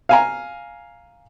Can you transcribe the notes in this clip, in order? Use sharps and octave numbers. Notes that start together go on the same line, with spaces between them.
F5 G#5 A#5